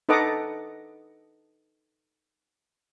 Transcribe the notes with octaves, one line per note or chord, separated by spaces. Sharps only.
D#4 A4 B4 D#5 F#5 D6